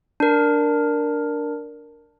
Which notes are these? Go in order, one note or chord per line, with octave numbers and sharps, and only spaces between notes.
D4 A#4